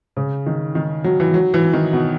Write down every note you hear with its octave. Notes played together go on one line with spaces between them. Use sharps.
C#3
D#3
D#3
F#3
E3
F#3
E3
D#3
B2